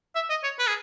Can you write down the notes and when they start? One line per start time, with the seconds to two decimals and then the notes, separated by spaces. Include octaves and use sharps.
0.15 E5
0.30 D#5
0.44 C#5
0.59 B4
0.67 G#4